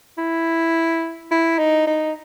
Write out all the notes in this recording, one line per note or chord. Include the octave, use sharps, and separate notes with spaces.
E4
E4
D#4
D#4